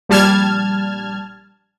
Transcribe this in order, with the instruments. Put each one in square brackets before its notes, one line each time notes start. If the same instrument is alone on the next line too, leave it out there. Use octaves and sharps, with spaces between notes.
[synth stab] A#1 G3 A5 F6 G#6